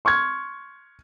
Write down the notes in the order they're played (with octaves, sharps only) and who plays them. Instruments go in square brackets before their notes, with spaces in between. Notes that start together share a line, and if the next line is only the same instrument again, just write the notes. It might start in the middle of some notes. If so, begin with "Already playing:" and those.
[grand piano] C6 C#6 F6 G#6